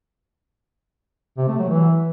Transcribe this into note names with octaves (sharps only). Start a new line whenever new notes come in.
C3
A3
F#3
E3